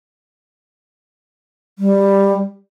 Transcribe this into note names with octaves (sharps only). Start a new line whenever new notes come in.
G3